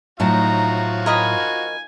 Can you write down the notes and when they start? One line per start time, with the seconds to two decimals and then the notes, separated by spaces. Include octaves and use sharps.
0.20 A2 F3 F#3 D#4 F#4 F5 A5 A#5
1.06 A#4 D#5 G#5 B5